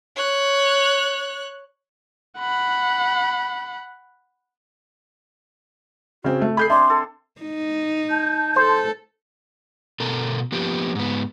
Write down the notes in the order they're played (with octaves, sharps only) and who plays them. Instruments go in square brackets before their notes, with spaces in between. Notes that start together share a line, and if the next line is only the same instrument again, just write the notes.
[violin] C#5 F#6
[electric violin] F#5 B5
[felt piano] C#3 C4 [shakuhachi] F#4
[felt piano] A3
[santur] G#4 [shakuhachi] A4 [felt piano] B5 G6 C7
[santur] C4 D4 C5 [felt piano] E5 [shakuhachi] C6
[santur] A4
[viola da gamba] D#4
[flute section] A5 G6
[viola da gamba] A4 [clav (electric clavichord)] C5
[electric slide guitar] B2 A4 A#4
F3 A#3 B3 G4
G#2 B3